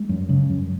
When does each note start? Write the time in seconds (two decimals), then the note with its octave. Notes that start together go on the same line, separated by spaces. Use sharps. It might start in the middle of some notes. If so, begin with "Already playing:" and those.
Already playing: G#3
0.09 F#2
0.29 C#3
0.49 F#2